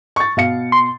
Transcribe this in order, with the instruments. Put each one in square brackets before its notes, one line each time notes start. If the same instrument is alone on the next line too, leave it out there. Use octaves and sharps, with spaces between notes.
[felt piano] C#6 A6
B2 F5 C#7
[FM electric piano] C6